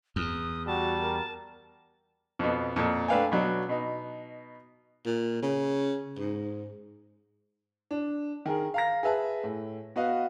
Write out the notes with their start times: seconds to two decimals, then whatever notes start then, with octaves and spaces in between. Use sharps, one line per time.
0.16 E2 D#6
0.67 G3 F#4 A5
1.02 A#4
2.39 F2 B2
2.76 F2 A#2
3.08 A3 D4 B4 F5 G5 G#5
3.32 B2 F#3 D4
3.69 B2 D#4
5.06 A#2
5.42 C#3
6.18 G#2
7.91 D4
8.46 D#3 G#4 A#4
8.74 F5 A#5 A#6
9.03 G#4 B4 E5 A5
9.43 A2
9.96 B3 F#4 B4 D#5 F5